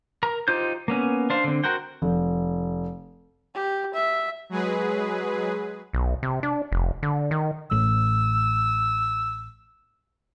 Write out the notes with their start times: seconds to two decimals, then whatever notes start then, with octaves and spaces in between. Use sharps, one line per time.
0.23 A#4 A#5
0.48 D#4 F4 G4 C5 G6
0.88 A#3 B3 C#4
1.30 D4 C5 F5
1.44 D3 C4
1.64 F#4 A#4 C5 F#5 G5
2.02 F1
3.55 G4
3.94 E5
4.49 F#3 G#3 G#4 B4
5.93 B1
6.23 C3
6.43 D4
6.72 F1
7.03 D3
7.31 D#3
7.71 A1 A2 E6